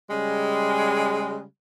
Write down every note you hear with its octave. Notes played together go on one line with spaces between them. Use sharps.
C#3 G3 G#3